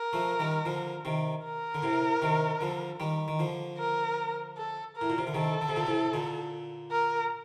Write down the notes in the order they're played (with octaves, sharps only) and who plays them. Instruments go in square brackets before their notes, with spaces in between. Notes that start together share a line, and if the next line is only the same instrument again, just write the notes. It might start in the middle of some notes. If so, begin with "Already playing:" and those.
Already playing: [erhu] A#4
[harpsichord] F3 A3
D#3 G3
D3 F3
C3 D#3
[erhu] A#4
[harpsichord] D3
A2 C3
C3 D#3
D3 F3
D#3 G3
D#3
D3 F3
[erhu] A#4
A4
A#4
[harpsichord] A2
A#2
C3
D3
[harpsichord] C3 D#3 [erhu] A4
[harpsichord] D3
C3
A#2 D3
A2 C3
A#2 D3
[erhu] A#4